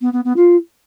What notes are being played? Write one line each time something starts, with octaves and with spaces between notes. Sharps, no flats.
B3
B3
B3
F4